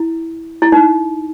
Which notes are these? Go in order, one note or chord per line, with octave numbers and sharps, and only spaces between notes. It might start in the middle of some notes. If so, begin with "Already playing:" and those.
Already playing: E4
E4
D#4